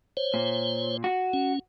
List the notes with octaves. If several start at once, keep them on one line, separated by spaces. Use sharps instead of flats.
C5 C#5
A#2
F#4
C#4